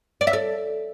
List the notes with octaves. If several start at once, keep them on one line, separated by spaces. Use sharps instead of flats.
D5
E5
A4